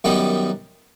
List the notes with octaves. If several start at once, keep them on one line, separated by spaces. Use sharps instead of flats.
F#2 D#3 G3 B3 D#4